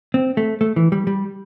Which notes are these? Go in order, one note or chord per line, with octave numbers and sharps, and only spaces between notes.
C4
A3
A3
E3
G3
G3